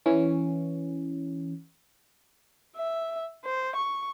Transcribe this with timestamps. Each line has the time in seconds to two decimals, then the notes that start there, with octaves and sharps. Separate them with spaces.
0.06 E3 C#4
2.76 E5
3.45 C5
3.76 C#6